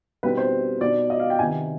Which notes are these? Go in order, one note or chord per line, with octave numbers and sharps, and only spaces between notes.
B2 G3 C4 D#4 B4
C5
B2 B3 D#4 D5
D#5
F5
G5
C3 D#3 B3 G#5